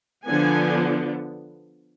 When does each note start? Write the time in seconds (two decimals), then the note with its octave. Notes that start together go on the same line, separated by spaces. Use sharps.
0.27 D3 F3 B3 D4 G#5